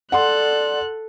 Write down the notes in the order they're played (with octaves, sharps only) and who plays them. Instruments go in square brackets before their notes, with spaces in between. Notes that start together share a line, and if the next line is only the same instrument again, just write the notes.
[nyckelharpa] A4 [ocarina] D5 [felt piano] F#5 C6 [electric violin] F#6